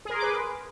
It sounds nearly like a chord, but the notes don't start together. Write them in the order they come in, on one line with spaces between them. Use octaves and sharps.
G#4 A#4 C6 D6 B4